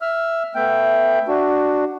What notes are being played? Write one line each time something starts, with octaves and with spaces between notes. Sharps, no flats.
E5 E6 F6
A3 B3 E5 G5
D4 F#4